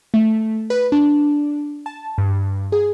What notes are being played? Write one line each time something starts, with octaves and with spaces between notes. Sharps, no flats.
A3
B4
D4
A5
G2
G#4